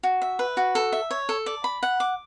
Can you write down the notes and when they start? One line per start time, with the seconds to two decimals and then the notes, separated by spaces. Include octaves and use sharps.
0.03 F#4
0.22 E5
0.39 B4
0.57 F#4
0.75 A4
0.93 E5
1.11 C#5
1.29 A4
1.46 D5
1.64 B5
1.83 F#5
2.00 D6